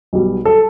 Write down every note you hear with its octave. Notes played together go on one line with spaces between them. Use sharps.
B1 B2 G3
A4